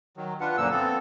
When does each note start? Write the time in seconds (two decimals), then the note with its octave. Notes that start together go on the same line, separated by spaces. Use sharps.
0.17 D#3 F#3
0.41 D4 F4 B4 F#5
0.57 F#2 A#2 D3 F3 A#3 E6
0.71 B3 C4 A4